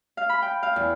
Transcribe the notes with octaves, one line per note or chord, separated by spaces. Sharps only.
F5
B5
G5
F5
E2